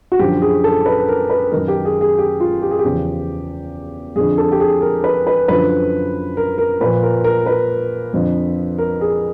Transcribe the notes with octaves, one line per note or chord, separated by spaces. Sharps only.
F#4
F#2 D3 F3 G4
G#4
A4
B4
A#4
B4
F#2 D#3 A#4
G4
G#4
G#4
G4
F4
G4
G#4
G4
E2 C#3 F3
F2 D3 F3 G#4
A4
G4
G#4
A#4
B4
B4
F#2 D3 F3 B4
A#4
A#4
A#2 F3 B4
A#4
A#4
B4
F2 D3 F3
A#4
G#4